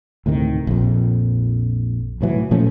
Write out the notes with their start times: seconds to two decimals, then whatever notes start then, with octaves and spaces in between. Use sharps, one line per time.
0.26 D2 A2 C3 D#3
0.67 A#1 F2
2.21 C2 A2 E3 F#3
2.51 A#2 F3 A3 C#4